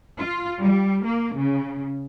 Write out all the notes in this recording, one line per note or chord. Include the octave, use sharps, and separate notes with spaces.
F4
G3
A#3
C#3